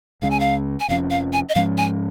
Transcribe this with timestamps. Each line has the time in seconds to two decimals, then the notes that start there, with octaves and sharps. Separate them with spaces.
0.22 C#2 C#3 G#3 C#4 F5
0.31 G#5
0.40 F5
0.80 G#5
0.88 F1 F2 F3 C#4 F5
1.11 F5
1.33 G#5
1.49 D#5
1.55 G#2 F3 G#3 C#4 F5
1.78 G#5